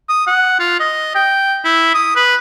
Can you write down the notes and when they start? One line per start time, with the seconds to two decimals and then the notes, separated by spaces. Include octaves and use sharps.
0.09 D#6
0.27 F#5
0.60 F4
0.80 D#5
1.15 G5
1.65 E4
1.94 D#6
2.16 B4